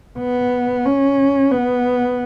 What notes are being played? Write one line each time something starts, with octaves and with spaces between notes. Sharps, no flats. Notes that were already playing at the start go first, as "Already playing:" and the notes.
B3
C#4
B3